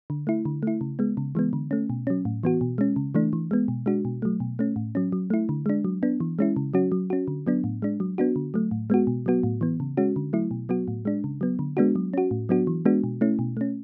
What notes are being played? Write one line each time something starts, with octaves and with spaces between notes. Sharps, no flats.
D3
A3 E4
D3
A3 E4
C#3
G#3 B3
C#3
E3 G#3 B3
D3
A3 C#4
B2
F#3 C#4
A2
E3 B3 F#4
B2
G#3 C#4
C#3
E3 A3 D4
E3
G#3 B3
B2
G#3 D4 F#4
B2
F#3 A3
B2
A3 C#4
A2
F#3 C#4
F#3
A3 E4
D3
G#3 D4
F#3
B3 D4
E3
G#3 C#4 E4
C#3
F#3 C#4 F#4
F#3
C#4 F#4
D3
F#3 B3 D4
A2
G#3 D4
F#3
B3 D4 F#4
D3
F#3 A3
A2
G#3 B3 F#4
B2
F#3 B3 F#4
A2
E3 B3
C#3
G#3 C#4 F#4
D3
F#3 A3 E4
B2
F#3 B3 F#4
A2
G#3 D4
C#3
F#3 B3
D3
G#3 B3 D4 F#4
F#3
C#4 F#4
A2
F#3 B3 D4 F#4
E3
G#3 B3 D4 F#4
B2
A3 C#4 E4
B2
A3 C#4